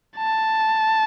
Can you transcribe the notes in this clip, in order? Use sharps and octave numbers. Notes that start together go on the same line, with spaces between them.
A5